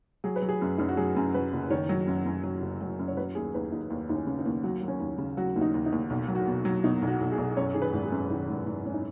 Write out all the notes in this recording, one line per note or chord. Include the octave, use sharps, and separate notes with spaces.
F#3 G#4
B4
F#3
G#4
F#2
F#2 D#4
F#4
F#3 G#4
F#2
F#3 B4
F#1
D#3 C#5
F#3
F#2
F#2
F#3
F#1
F#3
F#2
C#5
F#3 B4
D#2 G#4
D#2 B4
D#2 D#4
D#2
D#2 D#4
C#4
C#3
D#4
D#2
F#3 F#4
F#3
C#4
D#2
C#3
F#3 F#4
D#2
D#4
D#2
D#4
D#2
B1
F#3
F#4
B2
F#3
B2 D#4
B1
F#4
B1
G#4
B1
F#2 C#5
D#3 G#4
B4
G#1
G#4
F#2
D#3
G#1
G#1
G#1 C#4
D#4